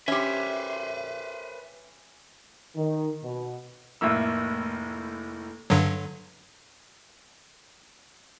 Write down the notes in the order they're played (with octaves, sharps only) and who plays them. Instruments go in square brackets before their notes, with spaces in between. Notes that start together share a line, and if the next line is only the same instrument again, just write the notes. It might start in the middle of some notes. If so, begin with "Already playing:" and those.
[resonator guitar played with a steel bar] C#4 G4 [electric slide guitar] B4 C5 [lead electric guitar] E5
[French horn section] D#3
B2
[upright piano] F1 A2 A3 A#3 E6
[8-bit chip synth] G2 D3 F#3